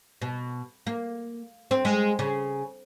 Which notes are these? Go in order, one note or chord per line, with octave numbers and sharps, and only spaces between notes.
B2
A#3
C4
G#3
C#3